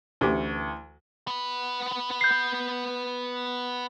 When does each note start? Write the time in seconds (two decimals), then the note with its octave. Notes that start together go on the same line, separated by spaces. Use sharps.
0.21 D2 E3 A3 C#4 G4
1.27 B3 B4
2.21 G6 C7